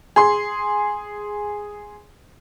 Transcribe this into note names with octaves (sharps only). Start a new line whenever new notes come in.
G#4 C6